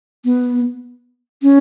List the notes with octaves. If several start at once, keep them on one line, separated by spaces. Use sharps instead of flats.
B3
C#4